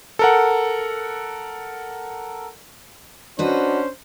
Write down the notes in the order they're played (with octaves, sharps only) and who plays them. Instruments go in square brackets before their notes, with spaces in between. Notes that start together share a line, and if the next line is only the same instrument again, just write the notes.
[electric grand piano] A4 A#4 F#5
[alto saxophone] C#4 [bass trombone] D4 [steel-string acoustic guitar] F#4 B4 D#5 [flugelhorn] C5